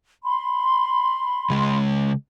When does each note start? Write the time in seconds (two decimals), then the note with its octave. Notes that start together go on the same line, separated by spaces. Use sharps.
0.24 B5 C6
1.50 C#3 G#3